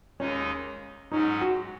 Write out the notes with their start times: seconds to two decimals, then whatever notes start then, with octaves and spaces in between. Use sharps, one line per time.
0.20 D#2 D#3 G#3 C#4 D#4
1.12 G#2 F#3 C#4 D#4
1.41 F#4